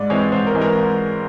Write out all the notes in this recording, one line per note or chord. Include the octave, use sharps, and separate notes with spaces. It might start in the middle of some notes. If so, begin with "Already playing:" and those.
Already playing: G#2 D5
E3 G#3 C4 C#5
G#2 C5
A#4
E3 G#3 C4
A#4